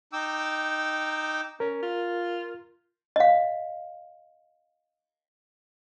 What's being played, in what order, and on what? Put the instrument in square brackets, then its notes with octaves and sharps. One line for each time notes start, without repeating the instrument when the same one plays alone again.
[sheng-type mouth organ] D#4 G5 D6 E6
[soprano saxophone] C#4 [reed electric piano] A#4
[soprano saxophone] F4
[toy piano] D#5 F5